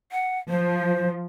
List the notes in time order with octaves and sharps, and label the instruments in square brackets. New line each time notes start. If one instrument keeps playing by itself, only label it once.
[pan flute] F#5
[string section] F3 [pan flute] C5